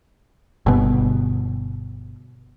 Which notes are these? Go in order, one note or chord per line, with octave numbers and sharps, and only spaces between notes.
G1 B2